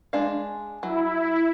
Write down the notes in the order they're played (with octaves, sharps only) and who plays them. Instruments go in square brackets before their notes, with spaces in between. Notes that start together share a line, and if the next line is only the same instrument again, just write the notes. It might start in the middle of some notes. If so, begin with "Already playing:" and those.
[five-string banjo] G#3 D4 F5
[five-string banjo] F#3 [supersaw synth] E4